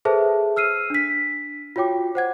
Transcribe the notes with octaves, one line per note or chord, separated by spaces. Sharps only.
G#4 A4 B4 C5 E5 A5
E6 F6 C7 D#7
D4 B6
F4 F#4 C#5 G5 D6
C5 F#5 G#6